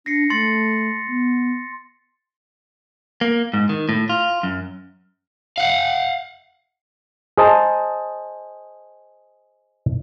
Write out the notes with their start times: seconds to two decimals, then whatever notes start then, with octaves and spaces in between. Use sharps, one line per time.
0.06 D4 A#6 C7 C#7
0.30 A3 C6 A6 C#7
1.07 B3
3.21 A#3
3.53 G#2
3.69 D#3
3.89 A2
4.09 F4
4.43 F#2
5.58 F5 F#5
7.37 G#4 C5 D#5 A5 A#5